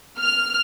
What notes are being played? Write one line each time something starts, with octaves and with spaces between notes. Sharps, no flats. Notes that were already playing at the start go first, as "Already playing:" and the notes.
F6